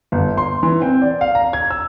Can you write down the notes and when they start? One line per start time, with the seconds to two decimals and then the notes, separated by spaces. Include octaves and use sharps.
0.12 G1
0.37 C6
0.63 E3
0.82 C4
1.02 D5
1.21 F5
1.35 A#5
1.53 G#6
1.71 E6